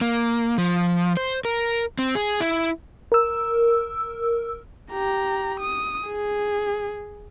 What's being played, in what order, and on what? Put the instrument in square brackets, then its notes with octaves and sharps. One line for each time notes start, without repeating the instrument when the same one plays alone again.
[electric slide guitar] A#3
F3
C5
A#4
C4
G#4
E4
[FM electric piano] A#4 E6
[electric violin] G4 A#5
D#6
G#4